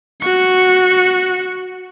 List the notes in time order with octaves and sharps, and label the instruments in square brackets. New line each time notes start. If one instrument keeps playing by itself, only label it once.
[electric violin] F#4 C#6